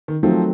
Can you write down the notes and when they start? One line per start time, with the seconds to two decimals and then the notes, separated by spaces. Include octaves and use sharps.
0.08 D#3
0.23 D#3 F3 F#3 A3 C4